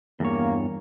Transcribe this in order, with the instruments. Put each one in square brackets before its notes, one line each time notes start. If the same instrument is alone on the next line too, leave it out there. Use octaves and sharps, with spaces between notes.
[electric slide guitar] E2 G2 C#5 [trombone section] A#3